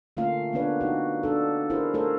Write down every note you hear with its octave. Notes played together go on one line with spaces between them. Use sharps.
D3 A3 A#3 C#4 F4 F5
A#3 B3 C#4 D4 B4 C#5
D#4 F#4
D4 A4
C#4 D4 E4 G#4 A#4 C5
A3 A4 A#4 C5 C#5